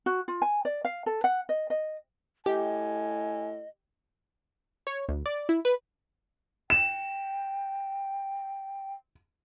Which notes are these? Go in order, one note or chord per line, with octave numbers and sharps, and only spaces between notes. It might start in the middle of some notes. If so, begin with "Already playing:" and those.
F#4
F4
G#5
D5
F5
A4
F#5
D#5
D#5
A2 G4 D#5 G#5
C#5
D2
D5
E4
B4
G5 E7